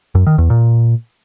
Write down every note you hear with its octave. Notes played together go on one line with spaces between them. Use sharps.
F#2
D#3
E2
A#2